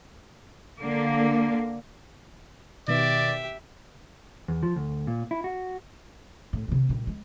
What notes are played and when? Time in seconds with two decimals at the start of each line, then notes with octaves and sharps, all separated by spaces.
0.80 D3 A#3
2.88 B2 D#3 B3 G4 D5 E5
4.48 E2
4.63 F3
4.76 D2
5.07 A#2
5.31 E4
5.44 F#4
6.53 A2
6.68 C3 D#3
6.89 A#2 G3
7.07 G#3